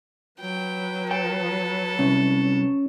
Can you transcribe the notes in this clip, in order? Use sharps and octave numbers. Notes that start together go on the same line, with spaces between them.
F#3 B4 G5
A4 G5
C2 C#4